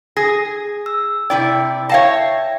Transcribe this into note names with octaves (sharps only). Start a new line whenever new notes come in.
G#4 A#6
E6
C3 E4 D5 G5
C#5 E5 F5 G5 A5 A#6